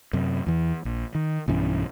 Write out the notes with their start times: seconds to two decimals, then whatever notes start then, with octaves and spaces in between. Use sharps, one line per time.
0.13 F#2 C3
0.46 E2 E3
0.85 A#1
1.15 D#3
1.48 B1 G2 E3 C#4